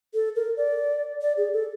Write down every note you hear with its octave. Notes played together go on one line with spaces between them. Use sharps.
A4
A#4
D5
D5
G#4
A4